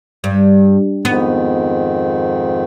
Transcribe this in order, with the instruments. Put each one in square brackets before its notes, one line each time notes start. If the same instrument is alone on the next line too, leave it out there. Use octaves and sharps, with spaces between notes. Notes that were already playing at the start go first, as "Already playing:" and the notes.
[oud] G2
[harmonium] F2 G#2 D#3 [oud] B3